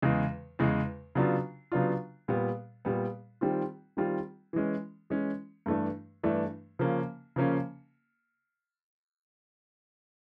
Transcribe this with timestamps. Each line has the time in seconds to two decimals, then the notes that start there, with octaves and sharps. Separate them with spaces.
0.02 E2 C#3 E3 G#3
0.59 E2 C#3 E3 G#3
1.15 C#3 F#3 B3 D4 F4
1.72 C#3 F#3 B3 D4 F4
2.28 A#2 G3 B3
2.85 A#2 G3 B3
3.41 D#3 G3 C4 F4
3.97 D#3 G3 C4 F4
4.53 E3 G#3 C#4
5.10 E3 G#3 C#4
5.66 G2 E3 A3 D4
6.23 G2 E3 A3 D4
6.79 C#3 F3 A#3 C#4
7.36 C#3 F3 A#3 C#4